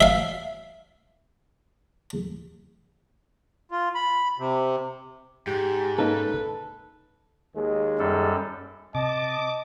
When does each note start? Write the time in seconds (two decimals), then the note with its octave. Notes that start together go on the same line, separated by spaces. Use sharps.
0.01 E5 F5
3.71 F4
3.95 B5
4.39 C3
5.47 G#2 G4
5.99 A#3 C#4 D#4 A4 B4
7.55 D#2 G#3
7.99 F#2 G3 A4
8.95 C3 D#5 A5 D6